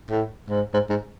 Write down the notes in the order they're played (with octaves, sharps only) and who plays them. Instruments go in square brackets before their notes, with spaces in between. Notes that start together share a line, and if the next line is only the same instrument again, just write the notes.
[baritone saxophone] A2
G#2
G#2
G#2